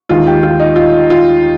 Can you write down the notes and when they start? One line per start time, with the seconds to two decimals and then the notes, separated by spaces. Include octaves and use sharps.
0.09 D#2 D#3 G#3 F4
0.27 G4
0.43 F4
0.60 D#4
0.76 F4
1.10 F4